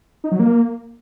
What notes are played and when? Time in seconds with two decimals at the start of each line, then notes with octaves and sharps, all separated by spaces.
0.24 D#4
0.32 F#3
0.39 A#3